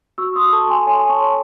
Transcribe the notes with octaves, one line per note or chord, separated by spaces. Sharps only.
F#4 C#6 E6
C6 D#6
A4 A5 C#6
G#5 C6
C#5 G#5 C6
A5 C#6
C#5